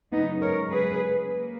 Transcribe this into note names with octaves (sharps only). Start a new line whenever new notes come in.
F#2 C#3 G#3 B3 D#4
A#4 C#5
G#4 B4
A#3